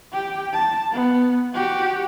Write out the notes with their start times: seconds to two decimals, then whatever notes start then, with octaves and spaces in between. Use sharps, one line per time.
0.13 G4 G5
0.53 A5
0.92 B3
1.54 F#4 G4